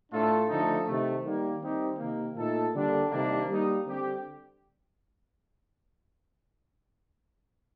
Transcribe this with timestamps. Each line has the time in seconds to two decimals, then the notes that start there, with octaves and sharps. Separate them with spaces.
0.12 A2 A3 D4 F4 A4
0.49 D3 F3 A3 D#4 A4
0.86 C3 D#3 A3
1.24 D#3 G3 A#3
1.61 D#3 G3 C4 D#4 G4
1.98 C3 D#3 A#3
2.36 A#2 A3 D#4 A4
2.73 D3 G3 A#3 D4
3.10 C3 D#3 G3 A#3 D4
3.48 G3 A#3 D#4
3.85 D3 G3 C4 G4